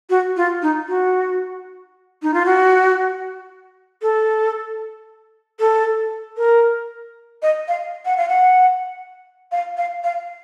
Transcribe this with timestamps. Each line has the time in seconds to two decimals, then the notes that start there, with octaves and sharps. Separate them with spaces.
0.10 F#4
0.37 F4
0.62 D#4
0.89 F#4
2.23 D#4
2.34 F4
2.46 F#4
4.02 A4
5.60 A4
6.37 A#4
7.42 D#5
7.68 F5
8.05 F#5
8.17 F5
8.29 F#5
9.52 F5
9.77 F5
10.04 F5